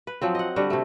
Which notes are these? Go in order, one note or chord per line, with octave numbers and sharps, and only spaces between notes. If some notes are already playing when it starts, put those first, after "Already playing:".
B4
F3 F#3 C4
D#5 F#5
D3 G3 F#4
C3 A3